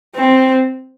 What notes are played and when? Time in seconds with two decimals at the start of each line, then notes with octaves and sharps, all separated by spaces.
0.15 C4